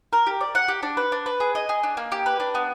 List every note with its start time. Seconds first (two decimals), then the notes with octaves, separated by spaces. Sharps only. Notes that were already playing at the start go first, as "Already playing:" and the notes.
0.13 A#4
0.27 G4
0.41 D5
0.55 F#5
0.68 G4
0.83 D4
0.97 B4
1.12 D4
1.26 B4
1.40 G#4
1.55 D#5
1.69 G#4
1.83 D4
1.97 A#3
2.12 G4
2.26 B4
2.40 D4
2.55 B3